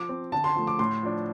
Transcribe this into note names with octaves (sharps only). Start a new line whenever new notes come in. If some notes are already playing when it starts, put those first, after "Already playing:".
Already playing: F3 D6
C4
D3 A5
C6
F3 A3
D6
A2 C6
F3 D4